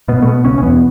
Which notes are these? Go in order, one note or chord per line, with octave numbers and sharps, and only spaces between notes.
B2 B3
A3
B2 B3
C#2 C#4
C#4
E2 B3